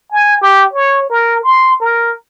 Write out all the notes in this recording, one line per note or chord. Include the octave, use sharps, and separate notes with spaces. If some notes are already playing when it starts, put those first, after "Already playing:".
G#5
G4
C#5
A#4
C6
A#4